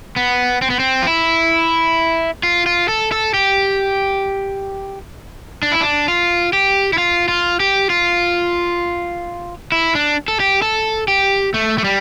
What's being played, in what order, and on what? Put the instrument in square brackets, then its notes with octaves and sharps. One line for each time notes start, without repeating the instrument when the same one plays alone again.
[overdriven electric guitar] B3
C4
B3
C4
F4
E4
F4
F4
A4
A4
G4
D4
E4
D4
F4
G4
E4
F4
F4
G4
F4
E4
D4
A4
G4
A4
G4
A3
A3
G3